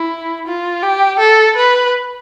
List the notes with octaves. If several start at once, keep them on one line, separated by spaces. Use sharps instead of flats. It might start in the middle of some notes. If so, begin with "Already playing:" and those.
Already playing: E4
F4
G4
A4
B4